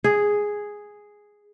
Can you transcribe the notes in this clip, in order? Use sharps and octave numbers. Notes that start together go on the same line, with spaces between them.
G#4